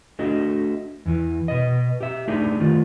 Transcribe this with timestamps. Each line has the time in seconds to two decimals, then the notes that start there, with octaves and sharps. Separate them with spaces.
0.19 A3 D4 F#4 D#5
1.06 E2 E3
1.48 B2 B4 D#5
2.01 G4 E5
2.28 A3 D4 D#4 G4 G#4
2.60 D#3 A3 F4